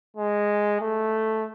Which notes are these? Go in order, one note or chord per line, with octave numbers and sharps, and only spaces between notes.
G#3
A3